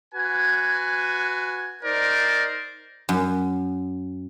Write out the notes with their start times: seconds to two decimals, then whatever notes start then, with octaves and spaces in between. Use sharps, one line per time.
0.13 F#4 B4 G#5
1.83 D#4 A#4 C5 D5
3.09 F#2